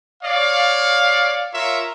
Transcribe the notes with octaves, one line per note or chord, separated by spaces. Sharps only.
C#5 D5 F5
F4 A#4 C#5 E5